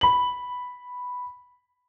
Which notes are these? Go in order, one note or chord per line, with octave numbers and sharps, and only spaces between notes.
B5 F#7